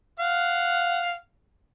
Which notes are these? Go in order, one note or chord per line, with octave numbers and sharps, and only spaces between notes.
F5 F#5